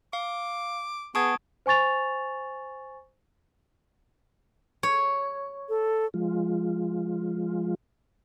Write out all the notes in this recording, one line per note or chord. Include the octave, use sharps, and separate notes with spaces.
F5 D6
B3 G#4 A5 C#6 D#6 G#6 D7
C5 G#5 C#6 A6 F7
C#5
A4
F3 G#3 F4